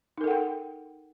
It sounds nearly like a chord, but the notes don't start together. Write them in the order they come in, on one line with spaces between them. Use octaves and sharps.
D#4 A#4 A4 F#5 G5